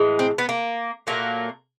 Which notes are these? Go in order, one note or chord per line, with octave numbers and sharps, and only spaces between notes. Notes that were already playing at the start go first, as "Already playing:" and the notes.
Already playing: A2 E3 G#3
C4
B3
A#3
A#2 F#3 A3 A#3